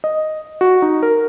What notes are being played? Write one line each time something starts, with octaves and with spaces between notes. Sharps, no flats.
D#5
F#4
D#4
A#4